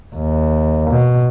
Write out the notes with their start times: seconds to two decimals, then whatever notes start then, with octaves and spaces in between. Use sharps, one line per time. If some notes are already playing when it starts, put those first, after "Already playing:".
0.16 D#2
0.90 B2